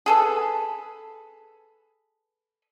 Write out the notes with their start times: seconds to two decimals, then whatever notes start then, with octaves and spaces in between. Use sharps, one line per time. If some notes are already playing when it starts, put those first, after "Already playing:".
0.06 G#4 A4 B4